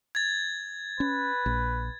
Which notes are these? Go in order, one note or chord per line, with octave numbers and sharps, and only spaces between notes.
G#6 A6
C#4 B4
A#1